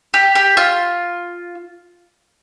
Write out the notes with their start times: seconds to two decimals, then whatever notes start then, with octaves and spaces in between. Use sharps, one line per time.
0.14 G4
0.35 G4
0.57 F4